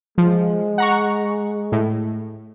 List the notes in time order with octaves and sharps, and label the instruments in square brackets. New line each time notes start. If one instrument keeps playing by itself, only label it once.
[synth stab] F3 [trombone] G#3
[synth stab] F#5 A#5 C#6
A2